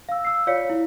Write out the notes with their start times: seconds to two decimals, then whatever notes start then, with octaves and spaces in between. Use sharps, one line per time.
0.09 F5 E6
0.25 E6 C7
0.47 F4 C#5 D5 F5 B6 C#7
0.70 E4